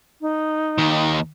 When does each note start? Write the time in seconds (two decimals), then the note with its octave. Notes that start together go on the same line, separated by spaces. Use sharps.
0.21 D#4
0.78 D#2 D#3